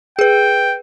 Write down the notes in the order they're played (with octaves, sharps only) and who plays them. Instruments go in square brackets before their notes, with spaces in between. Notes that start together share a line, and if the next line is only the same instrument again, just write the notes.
[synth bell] G#4 B4 [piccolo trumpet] G5